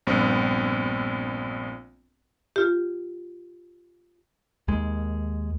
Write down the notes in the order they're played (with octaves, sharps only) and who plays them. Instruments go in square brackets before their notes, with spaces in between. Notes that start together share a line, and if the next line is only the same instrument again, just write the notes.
[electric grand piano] A#1 G2 B3 C4
[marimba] F4 G4
[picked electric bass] D#2 G#3